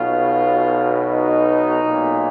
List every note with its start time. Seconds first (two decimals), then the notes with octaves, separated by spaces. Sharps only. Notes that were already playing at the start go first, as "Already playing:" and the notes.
Already playing: B1 B2 F4
1.10 D#4
1.81 B1 A#2